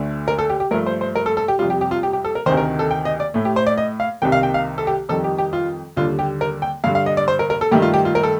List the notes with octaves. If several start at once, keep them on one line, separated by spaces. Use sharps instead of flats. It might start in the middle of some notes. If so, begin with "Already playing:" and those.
Already playing: D2 D3 A3
A#4
A4
G4
G4
G2 F3 A3 A#4
C5
C5
A#4
A4
A4
G4
F2 C3 G3 F4
G4
G4
F4
G4
G4
A4
A#4
D2 C3 D#3 C5
A#4
A4
G5
D#5
D5
A2 A3
G4
C5
D5
D#5
F5
C2 C3 D#3 G5
F5
G5
F5
A4
G4
F2 D#3 G3 A4
G4
G4
F4
D#2 D3 G3 F4
G4
A#4
G5
G2 D3 G3 F5
F5
D#5
D5
C5
A#4
A#4
A4
G2 D#3 A3 G4
F4
G4
F4
A#4
A4